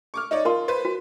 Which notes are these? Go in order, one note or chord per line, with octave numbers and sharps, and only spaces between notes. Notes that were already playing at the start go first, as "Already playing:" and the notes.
C#6 D6 F6
D#4 C#5 D5
F4 A#4 A5 C6
B4 C5
F#4